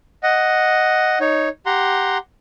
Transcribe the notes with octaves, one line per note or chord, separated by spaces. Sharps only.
D#5 F#5
D#4 C#5
G4 F#5 A#5 C6